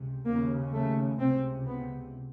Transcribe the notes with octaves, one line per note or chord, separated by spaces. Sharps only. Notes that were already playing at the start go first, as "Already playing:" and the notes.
Already playing: C#2 C3
D#2 C#3 A#3
A3
C#2 C3 C4
B3